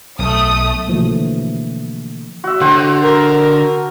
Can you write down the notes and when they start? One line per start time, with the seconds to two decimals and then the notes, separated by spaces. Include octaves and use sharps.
0.19 B1 A3 D#6
0.87 B2 D3 E3 F3 A3 A#3
2.44 F#4 E5
2.61 D3 F#4 C5 F#5
3.02 A#4